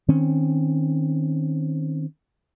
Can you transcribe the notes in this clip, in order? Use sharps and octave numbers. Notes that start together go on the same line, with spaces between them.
D#3 C4 C#4